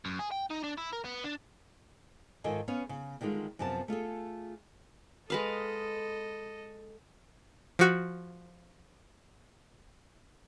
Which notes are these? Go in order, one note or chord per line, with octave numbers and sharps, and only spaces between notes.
F#2
G#4
G5
D#4
D4
E4
A#4
B3
D4
G#2 D#3 F4 A4 D#5 G#5
B3 C#4 C#5 F5
C#3
D3 D#3 G3 G#3 F4
F#2 C3 F3 B3 A5
A3 F4 G#4 A4
G#3 A4 B4 D#5 F5
F3 F#4